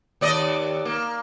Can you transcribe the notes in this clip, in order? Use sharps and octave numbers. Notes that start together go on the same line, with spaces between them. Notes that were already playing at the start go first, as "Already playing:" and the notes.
D#2 D5 D#5
A#3